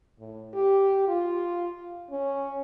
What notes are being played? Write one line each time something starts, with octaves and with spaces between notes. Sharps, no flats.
A2
G4
F4
C#4